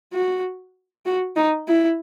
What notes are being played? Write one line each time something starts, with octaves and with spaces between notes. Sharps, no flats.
F#4
F#4
D#4
E4